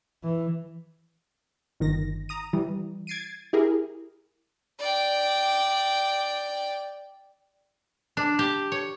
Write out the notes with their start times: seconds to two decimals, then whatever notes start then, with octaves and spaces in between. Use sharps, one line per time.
0.23 E3
1.80 G1 D#3 A#6
2.29 A#5 D#6 D#7
2.53 E3 G3
3.07 G#6 A6 C7 D7 D#7
3.53 E4 G4 G#4 A#4
4.79 D5 G5
8.17 D4
8.39 G4
8.72 C#5